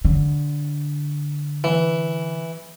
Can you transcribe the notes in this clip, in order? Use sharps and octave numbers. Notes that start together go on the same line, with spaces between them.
D3
E3